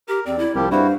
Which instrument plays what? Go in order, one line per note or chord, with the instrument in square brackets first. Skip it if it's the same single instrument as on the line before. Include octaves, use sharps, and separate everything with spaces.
[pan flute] G4 [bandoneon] A#4
[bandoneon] E2 [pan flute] C4 [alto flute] D5
[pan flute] E4
[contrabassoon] C2 [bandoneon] F3 G3 G4 [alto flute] A#4
[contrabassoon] G2 [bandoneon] E4 F#4 [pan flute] C5 [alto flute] F5